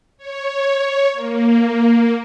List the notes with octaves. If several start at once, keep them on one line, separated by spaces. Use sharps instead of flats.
C#5
A#3